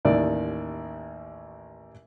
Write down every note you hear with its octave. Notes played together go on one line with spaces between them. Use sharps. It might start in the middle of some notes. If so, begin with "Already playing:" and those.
A1 D#2 D5